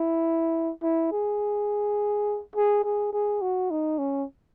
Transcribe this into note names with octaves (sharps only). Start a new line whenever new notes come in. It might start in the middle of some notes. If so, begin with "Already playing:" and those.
Already playing: E4
E4
G#4
G#4
G#4
G#4
F#4
D#4
C#4